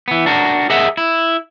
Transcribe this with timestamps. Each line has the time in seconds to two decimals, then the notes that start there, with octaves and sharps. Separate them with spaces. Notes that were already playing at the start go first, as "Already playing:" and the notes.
0.08 E3 B3
0.26 D4 F#4 A#4
0.70 G#4 A#4 D#5 E5 F#5
0.97 E4